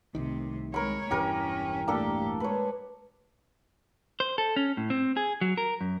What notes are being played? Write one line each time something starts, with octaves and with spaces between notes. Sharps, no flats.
C2 A2 C3 D#3
G#3 A#4 C#5 B5
E1 G2 E3 C#4 G4 A#4
A2 A#3 D4 G4 A4
G#3 B4 C#5
C5
A4
C#4
A2
C4
G#4
F#3
A#4
F#2